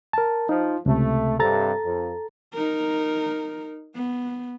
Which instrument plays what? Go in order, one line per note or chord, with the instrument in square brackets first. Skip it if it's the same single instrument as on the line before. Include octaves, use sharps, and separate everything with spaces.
[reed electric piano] A#4 A5
[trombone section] F3 [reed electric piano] D#4
[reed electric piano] C#2 C3 [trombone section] A3
[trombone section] G2 C3 [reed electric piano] A4 A#5 A6
[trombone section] F2
[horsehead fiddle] D#4 A#4
B3